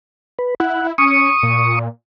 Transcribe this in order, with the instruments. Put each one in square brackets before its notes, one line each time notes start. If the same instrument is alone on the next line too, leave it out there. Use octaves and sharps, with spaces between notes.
[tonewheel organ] B4
[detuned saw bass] E4 [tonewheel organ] F#5
[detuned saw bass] C#4 [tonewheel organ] C#6 D#6
[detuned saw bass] A#2